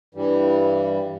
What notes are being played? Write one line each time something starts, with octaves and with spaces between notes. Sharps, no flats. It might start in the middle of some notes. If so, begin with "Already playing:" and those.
G2 E3 G3